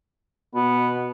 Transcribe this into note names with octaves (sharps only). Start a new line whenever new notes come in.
B2 B3